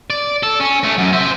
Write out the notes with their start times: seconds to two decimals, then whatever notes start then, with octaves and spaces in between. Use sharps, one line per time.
0.10 D5
0.43 A4
0.60 C#4
0.83 A3 C#4
0.98 F#2
1.13 C5 E5